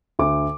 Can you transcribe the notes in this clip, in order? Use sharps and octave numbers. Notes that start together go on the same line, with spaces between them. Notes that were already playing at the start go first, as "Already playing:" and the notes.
D2 D6